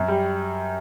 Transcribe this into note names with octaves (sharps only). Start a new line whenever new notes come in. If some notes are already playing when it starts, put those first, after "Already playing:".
Already playing: F#2
G3